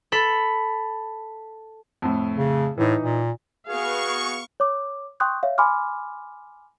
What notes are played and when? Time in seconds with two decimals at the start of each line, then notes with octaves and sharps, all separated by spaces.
0.12 A4 B5
2.02 F2 A2
2.37 C#3
2.78 A2 E3 D#4
3.03 A#2
3.68 B3 F#4 G#4 B4 F5 C#6
4.60 C#5 D6
5.20 G5 C6 C#6 D#6 F#6 G6
5.43 C#5 E5 F5
5.58 G#5 B5 C6 D6 F6